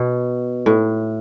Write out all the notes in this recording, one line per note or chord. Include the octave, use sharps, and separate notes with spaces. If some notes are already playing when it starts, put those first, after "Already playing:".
Already playing: B2
A2